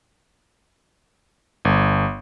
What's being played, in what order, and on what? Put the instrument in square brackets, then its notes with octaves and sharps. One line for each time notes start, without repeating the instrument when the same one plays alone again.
[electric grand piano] G1